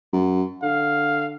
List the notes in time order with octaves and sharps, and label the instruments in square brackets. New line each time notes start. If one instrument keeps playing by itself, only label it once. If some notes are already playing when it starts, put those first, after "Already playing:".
[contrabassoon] F#2
[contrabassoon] D3 [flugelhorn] F5